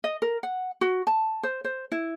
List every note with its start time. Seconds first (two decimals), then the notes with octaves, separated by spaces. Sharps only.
0.04 D#5
0.22 A#4
0.43 F#5
0.81 F#4
1.07 A5
1.43 C5
1.64 C5
1.92 E4